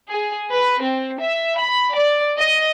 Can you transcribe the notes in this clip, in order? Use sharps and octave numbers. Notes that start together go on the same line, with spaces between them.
G#4
B4
C4
E5
B5
D5
D#5